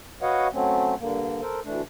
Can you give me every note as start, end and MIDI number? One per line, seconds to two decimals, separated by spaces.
0.22 0.48 66
0.22 0.48 71
0.22 0.48 73
0.22 0.48 75
0.22 0.48 77
0.22 0.48 78
0.53 0.95 54
0.53 0.95 57
0.53 0.95 60
0.53 0.95 61
1.00 1.41 43
1.00 1.41 50
1.00 1.41 58
1.42 1.60 69
1.42 1.60 70
1.42 1.60 72
1.65 1.82 38
1.65 1.82 52
1.65 1.82 57
1.65 1.82 62